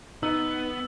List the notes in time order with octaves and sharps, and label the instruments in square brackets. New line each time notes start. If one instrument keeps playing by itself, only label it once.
[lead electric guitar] B3 [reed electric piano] D#4 [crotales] E6